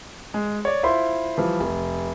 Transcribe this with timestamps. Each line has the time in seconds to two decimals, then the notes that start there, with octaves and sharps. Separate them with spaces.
0.34 G#3
0.65 C#5 D5
0.83 E4 F4 C5 B5 C6
1.38 E3 F3 G3
1.60 F1